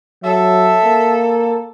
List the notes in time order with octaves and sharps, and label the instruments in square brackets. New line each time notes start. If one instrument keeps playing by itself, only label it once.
[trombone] F#3 [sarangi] A4 [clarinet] E5
[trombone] A#3